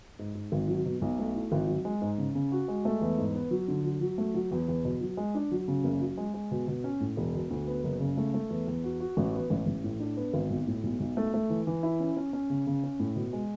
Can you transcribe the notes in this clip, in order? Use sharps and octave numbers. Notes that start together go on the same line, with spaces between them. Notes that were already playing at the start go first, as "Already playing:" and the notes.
G#2
G#2
G#1
F#3
B2
B1
A3
E4
G#1
F#3
G#3
G#2
C#3
C#3
F#4
G#3
A3
E2
G#2
B3
F#3
D3
F#3
F#3
A3
F#3
E2
E2
B2
F#3
G#3
D4
F#3
C#3
F#1
F#3
G#3
G#3
B2
B2
C#4
A2
E1
B2
D2
B3
F#1
C#3
A3
A3
E2
E2
F#4
F#4
A1
B3
A1
A1
A2
D4
B3
G#1
B1
A2
B1
B1
A3
A3
E3
E3
E4
C#4
C#4
C#4
C#3
C#3
C#4
A2
B2
G#3